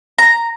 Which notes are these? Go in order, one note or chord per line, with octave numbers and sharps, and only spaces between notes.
A#5